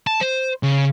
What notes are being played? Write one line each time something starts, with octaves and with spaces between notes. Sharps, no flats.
A5
C5
C#3